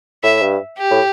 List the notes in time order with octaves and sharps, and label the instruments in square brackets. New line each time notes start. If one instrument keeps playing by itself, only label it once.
[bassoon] A2 [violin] E5
[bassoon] G2
[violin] G4
[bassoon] A2